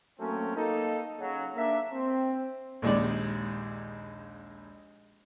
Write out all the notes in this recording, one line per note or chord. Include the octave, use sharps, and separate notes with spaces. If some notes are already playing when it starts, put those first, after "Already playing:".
F#3 A3 A#3 C4 C#4
A#3 D#4 A4
C#3 F#3
A#3 D4 E5
C4
A#1 D#2 G#3 D#4 D5